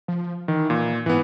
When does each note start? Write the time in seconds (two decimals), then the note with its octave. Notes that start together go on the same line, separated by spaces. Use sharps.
0.08 F3
0.48 D#3 E3
0.70 A#2
1.06 G#2 E3 B3